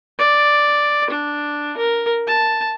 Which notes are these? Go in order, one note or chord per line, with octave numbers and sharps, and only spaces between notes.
D5
D4
A#4
A5